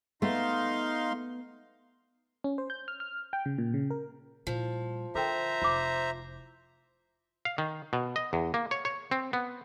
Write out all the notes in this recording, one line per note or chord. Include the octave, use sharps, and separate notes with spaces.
A3 B3 D#4 F5 C6
C#4
C5
G6
F6
F6
G5
C#3
A#2
C#3
A#4
A#2 F3 G3
D3 A4 A#4 C5 E5 G5 A#5
F1 F4 D6
F5
D#3
B2
D#5
E2
A#3
C#5
C#5
C4
B3